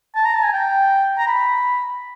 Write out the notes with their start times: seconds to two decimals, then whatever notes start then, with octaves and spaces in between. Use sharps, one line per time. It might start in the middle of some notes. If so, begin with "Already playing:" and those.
0.16 A5
0.25 A#5
0.35 A5
0.43 G#5
0.53 G5
1.18 A#5
1.28 B5